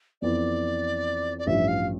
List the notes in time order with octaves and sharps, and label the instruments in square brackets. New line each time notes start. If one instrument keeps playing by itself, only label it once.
[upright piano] F2 E3 B3 [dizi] D5
[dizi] D5
[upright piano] A1 G2 F3 [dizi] E5
[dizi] F5